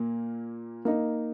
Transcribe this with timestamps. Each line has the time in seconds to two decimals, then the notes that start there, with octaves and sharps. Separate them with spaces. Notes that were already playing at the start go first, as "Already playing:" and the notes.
Already playing: A#2 A#3
0.85 A#3 D#4